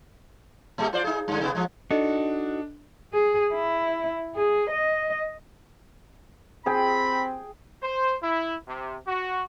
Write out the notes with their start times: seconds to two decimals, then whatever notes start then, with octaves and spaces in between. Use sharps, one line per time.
0.78 A#2 G#3 G4
0.93 F4 C5 D5
1.04 D#4 G#4
1.28 G2 D3
1.41 C3 B3
1.55 F3 G#3
1.91 D4 D#4 F#4 A4 D#5
3.14 G#4
3.53 E4
4.36 G#4
4.71 D#5
6.66 C4 G#4 G5 B5
7.83 C5
8.23 E4
8.67 C3
9.07 F#4